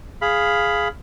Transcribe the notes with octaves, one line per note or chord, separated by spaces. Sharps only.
G#4 F5 B5